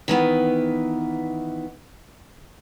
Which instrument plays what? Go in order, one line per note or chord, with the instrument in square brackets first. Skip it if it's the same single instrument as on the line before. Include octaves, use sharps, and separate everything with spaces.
[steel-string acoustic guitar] D#3 E3 B3